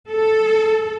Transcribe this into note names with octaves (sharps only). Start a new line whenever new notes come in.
A4